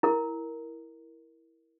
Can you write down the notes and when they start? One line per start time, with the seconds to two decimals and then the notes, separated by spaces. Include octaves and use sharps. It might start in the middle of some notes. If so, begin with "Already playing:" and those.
0.03 E4 A#4